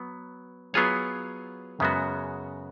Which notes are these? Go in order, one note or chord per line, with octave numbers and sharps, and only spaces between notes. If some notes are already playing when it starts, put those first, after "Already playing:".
Already playing: F#3 B3
F#3 B3 F4 G#4 C#5
F#2 C#3 G#3 B3 F#4